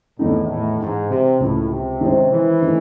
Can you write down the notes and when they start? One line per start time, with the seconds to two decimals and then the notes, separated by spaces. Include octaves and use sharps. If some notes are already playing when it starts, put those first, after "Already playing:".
0.19 E2 A2 D#3 A3 D#4
0.50 A2
0.80 G#2 E3 G#3 D#4
1.10 C3
1.40 C#2 A2 C#3 F#3
1.70 C3
2.01 D#3 G#3 C#4 G#4 C5
2.32 E3
2.62 D#3 A3 C#4